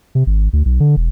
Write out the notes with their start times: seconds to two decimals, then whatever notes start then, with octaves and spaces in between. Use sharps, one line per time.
0.15 C3
0.27 G#1
0.53 D2
0.65 B1
0.80 D3
0.97 E1